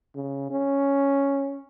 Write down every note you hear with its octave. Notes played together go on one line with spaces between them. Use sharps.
C#3
C#4